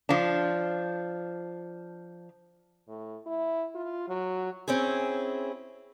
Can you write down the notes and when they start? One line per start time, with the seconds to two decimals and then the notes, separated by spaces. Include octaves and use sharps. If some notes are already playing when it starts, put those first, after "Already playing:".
0.09 F3 D4
2.88 A2
3.26 E4
3.75 F4
4.08 F#3
4.68 C4 C#4 E4 G#4